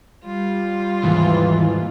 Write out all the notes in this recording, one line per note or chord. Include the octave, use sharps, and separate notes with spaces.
G3 F4
D#2 G#2 E3